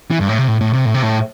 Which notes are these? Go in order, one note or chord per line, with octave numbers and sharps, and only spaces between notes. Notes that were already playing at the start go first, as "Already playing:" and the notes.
E3
G2
A2
C3
A2
A2
C3
A2
C3
A2